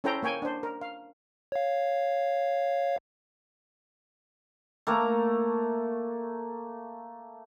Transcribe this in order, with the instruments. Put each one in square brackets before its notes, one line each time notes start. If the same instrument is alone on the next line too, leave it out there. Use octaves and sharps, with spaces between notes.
[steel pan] C#4 E4 A4 C5 G5 A#5
A#3 C#5 G5 G#5
D4 C5
A#4
F5
[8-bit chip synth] C#5 F5
[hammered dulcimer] A3 A#3 A#5